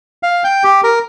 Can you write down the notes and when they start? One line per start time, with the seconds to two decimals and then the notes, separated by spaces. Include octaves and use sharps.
0.23 F5
0.44 G5
0.64 G4
0.84 A#4